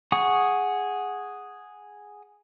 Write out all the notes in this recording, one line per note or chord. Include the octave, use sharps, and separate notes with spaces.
G#4 F#5 C#6 D#6